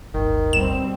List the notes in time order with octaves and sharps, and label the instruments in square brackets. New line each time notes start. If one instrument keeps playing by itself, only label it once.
[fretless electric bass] D1 G1 [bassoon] D#3
[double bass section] B2 G3 C4 [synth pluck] E7